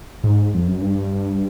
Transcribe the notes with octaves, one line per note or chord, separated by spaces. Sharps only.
G#2
F2
F#2
G2